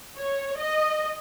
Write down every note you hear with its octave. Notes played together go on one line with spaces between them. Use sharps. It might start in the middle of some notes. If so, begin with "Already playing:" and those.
C#5
D#5